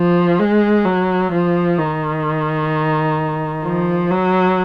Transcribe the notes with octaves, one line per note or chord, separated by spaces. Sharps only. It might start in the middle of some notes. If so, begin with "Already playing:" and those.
Already playing: F3
G#3
F#3
F3
D#3
F3
F#3